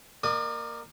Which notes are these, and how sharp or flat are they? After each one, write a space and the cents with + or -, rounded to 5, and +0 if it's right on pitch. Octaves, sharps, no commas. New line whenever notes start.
A#3 +0 D5 +45 D#6 +0